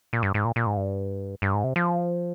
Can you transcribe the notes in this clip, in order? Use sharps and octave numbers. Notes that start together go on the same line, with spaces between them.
A#2
G2
G#2
A#2
A#2
G#2
G2
G2
G#2
C3
F3